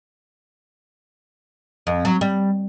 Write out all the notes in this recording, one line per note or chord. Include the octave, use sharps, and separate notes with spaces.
F2
F#3
G3